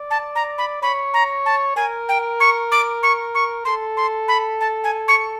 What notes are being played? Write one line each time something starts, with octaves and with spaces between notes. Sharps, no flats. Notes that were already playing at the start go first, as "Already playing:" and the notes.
Already playing: D5
A5
A#5
B5
C#5 B5
A#5
A5
A#4 G#5
G5
C#6
D6
C#6
C#6
A4 C6
C6
B5
A5
G#5
C#6